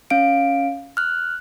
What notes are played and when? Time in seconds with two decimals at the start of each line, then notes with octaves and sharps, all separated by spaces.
0.10 C#4 F5 D7
0.97 F6 F#6